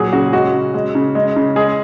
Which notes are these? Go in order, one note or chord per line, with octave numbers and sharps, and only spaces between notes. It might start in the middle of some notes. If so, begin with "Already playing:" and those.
Already playing: A#2 F#3 G#4
C#3 F#4
G#3 F#4
C#3
G#3
C#3
G#3
C#3
G#3 G#4